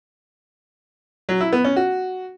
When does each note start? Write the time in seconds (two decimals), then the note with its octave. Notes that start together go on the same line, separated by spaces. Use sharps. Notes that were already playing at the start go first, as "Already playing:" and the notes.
1.29 F#3
1.41 E4
1.53 B3
1.64 C#4
1.76 F#4